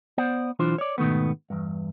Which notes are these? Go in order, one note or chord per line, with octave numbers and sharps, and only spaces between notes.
B3 C5 D5 F#5
B1 E3 D4 F4 C5
C#5 D5
G#2 B2 D#3 A3 B3
E2 G2